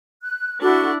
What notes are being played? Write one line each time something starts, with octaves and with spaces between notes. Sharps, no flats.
F#6
D4 E4 F#4 A4